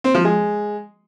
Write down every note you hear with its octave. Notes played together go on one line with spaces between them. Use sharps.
C4
F3
G#3